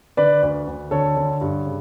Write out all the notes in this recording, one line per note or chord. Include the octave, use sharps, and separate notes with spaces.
D3 B4 D5
D2
D2
D3 A4 C#5
D3
G2
C#3